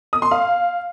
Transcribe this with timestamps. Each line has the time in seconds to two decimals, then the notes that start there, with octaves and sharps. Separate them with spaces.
0.13 D#6
0.22 C6
0.31 F5